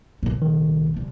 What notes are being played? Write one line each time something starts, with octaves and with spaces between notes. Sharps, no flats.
C2 A#2
D#3
C2